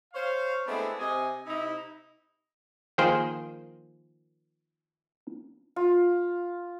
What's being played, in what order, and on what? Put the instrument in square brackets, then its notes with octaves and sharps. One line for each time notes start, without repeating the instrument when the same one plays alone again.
[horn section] C5 C#5 F5
G#3 A3 B3 C4 D4 E4
C3 D#5 G#5
C3 D#4 E4
[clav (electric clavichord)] D#3 F3 A#3 G#4 C5 G5
[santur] F4